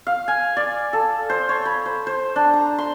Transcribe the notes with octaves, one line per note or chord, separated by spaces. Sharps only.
F5
G#5
D5
A4
C5
C#5
B5
C5
C5
D4
A#5
C6